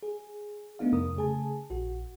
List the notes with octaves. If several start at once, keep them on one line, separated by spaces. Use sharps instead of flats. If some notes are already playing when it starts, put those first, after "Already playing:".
G#4
A3 B3 D4 D#4 F5
F2 C3 A#4 D#6
C#3 A3 G#4 G#5 A5
A#1 F#4